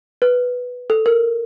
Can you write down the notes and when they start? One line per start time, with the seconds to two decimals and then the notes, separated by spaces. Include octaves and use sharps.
0.22 B4
0.90 A4
1.06 A#4